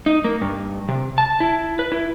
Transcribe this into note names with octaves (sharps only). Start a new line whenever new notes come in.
D#4
A#3
G2
C3
A5
E4
B4
E4